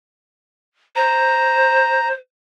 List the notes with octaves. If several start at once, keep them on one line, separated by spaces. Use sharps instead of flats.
C5 A#5